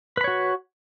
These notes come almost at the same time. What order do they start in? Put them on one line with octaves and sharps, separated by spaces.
B4 B5 C#5 F#4